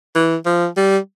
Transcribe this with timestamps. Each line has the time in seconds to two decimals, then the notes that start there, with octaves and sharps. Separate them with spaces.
0.15 E3
0.46 F3
0.76 G3